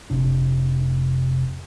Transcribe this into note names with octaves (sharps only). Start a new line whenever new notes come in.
F1 C3 D4